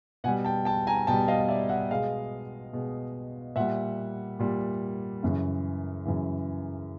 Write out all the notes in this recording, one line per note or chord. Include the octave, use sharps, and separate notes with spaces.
B2 G3 F#5 G#5
G5 A5
G5 A5
G#5 A#5
B2 G3 G5 A5
D#5 F5
D5 E5
E5 F#5
B2 G#3 D#5 F5
B2 G#3
A#2 G3 E5 F#5
A#2 G3
F#2 C#3 E3
F#2 C#3 E3